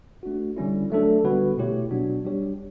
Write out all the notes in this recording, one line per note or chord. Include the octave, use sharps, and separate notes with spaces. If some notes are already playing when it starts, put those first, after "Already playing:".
A3 D4 F#4
D3 G3 C#4 E4
F#3 A3 D4 A4
D3 G3 B3 F#4 B4
B2 A3 E4 G4 C#5
B2 F#3 B3 D4 F#4
G3 D4 G4 C#5